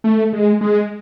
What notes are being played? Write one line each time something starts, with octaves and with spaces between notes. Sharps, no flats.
A3
G#3
G#3